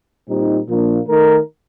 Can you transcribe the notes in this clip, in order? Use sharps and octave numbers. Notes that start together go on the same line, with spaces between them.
A#2 G3 C4 D#4
A#2 F3 A#3 D4
D#3 A3 D#4 A#4